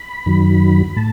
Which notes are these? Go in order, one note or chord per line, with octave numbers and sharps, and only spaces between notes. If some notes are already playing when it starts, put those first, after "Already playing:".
Already playing: B5
F#2 D#3 F#3
A2 A5